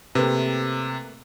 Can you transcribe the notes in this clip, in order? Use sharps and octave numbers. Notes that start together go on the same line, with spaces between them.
C3 A3 A#3 B4